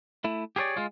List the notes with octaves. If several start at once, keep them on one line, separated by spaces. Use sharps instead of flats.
A3 E4
G4 G#4 A#4 C#5 D5
G#3 F4